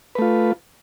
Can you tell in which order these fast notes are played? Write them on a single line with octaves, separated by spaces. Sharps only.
B4 A3 F4